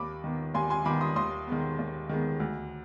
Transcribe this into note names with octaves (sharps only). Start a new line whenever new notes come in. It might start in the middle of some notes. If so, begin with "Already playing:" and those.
Already playing: D#2 B5 D6
D#3 B3
D#2 G#5 C6
G#5 C6
D#3 B3 B5 D6
C6 D#6
D#2 C6 D#6
D#3 G#3 B3
D#2
D#3 G#3 B3
D2